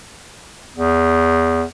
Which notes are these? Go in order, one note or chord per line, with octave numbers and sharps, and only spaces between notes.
E2